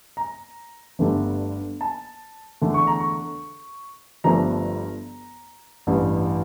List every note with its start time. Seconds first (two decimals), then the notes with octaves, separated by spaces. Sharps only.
0.17 A#5
0.99 G1 G2 D3 A3 D4
1.81 A5
2.61 E2 D3 A3 D4
2.74 C#6
2.87 A#5
3.00 C#6
4.24 G1 G2 F3 A3 D4 A#5
5.87 A1 G2 E3